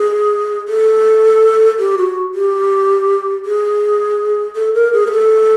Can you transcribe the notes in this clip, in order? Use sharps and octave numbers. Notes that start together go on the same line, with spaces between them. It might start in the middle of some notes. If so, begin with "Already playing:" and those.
Already playing: G#4
A4
G4
F#4
G4
G#4
A4
A#4
G#4
A#4
A4